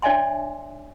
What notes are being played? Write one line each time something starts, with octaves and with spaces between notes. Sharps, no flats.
D4 C#5 D5 E5 G#5 C6